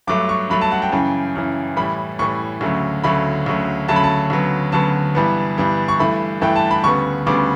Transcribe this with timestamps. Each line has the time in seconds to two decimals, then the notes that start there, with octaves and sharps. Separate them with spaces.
0.07 G2 F#3 A3 D6
0.29 C#6
0.50 G2 F#3 A3 B5
0.61 A5
0.71 F#5
0.82 G5
0.92 F#2 C#3 E3
1.35 F#2 C#3 E3
1.76 A2 E3 G3 B5
2.19 A2 E3 G3 C#6
2.61 D2 C#3 F#3 A3
3.04 D2 C#3 F#3 A3 B5
3.46 D2 C#3 F#3 A3
3.88 D2 C#3 F#3 A3 A5
3.96 B5
4.04 A5
4.30 D2 C#3 F#3 B3
4.72 D2 C#3 F#3 B3 A5
5.15 G2 E3 G3 B3
5.58 G2 E3 G3 B3
5.88 C#6
5.99 G2 E3 A3 B5
6.41 G2 E3 A3 G5
6.56 A5
6.71 B5
6.84 D2 C#3 G3 B3 C#6
7.26 D2 C#3 G3 B3 D6